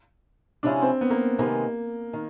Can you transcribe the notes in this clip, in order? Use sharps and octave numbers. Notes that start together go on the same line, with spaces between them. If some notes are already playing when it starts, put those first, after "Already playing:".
C3 F3 G#3 C#4 D4 E4
C4
B3
A#3
C3 D#3 G#3 A#3 B3
D#3